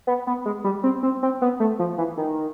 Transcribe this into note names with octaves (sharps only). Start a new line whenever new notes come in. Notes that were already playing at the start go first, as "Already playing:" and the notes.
B3
B3
G#3
G3
C4
C4
C4
B3
A3
F3
E3
D#3